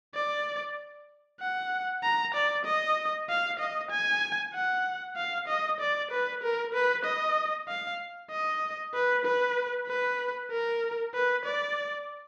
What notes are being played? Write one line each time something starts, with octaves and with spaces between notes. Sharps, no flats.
D5
F#5
A#5
D5
D#5
F5
D#5
G#5
F#5
F5
D#5
D5
B4
A#4
B4
D#5
F5
D#5
B4
B4
B4
A#4
B4
D5